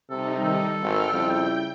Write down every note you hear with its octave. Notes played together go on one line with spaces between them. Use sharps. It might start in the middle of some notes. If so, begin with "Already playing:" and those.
C3 G3 D#4 A4
D#3 A4
G#1 G5 F6
F2 C#3 G3 E4 G5 G6